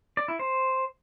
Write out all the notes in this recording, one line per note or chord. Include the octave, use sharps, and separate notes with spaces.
D5
E4
C5